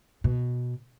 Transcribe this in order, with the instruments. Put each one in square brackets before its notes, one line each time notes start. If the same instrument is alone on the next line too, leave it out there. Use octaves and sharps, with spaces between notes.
[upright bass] B2